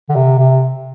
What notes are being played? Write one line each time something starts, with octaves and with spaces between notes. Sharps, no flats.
D3
C3
C3